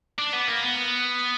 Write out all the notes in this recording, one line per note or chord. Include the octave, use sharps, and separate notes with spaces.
D4
B3
A#3
B3